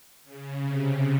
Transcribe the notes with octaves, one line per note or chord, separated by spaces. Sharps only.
C#3
C3